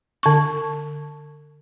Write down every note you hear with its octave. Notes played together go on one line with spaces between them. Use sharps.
D3 C#6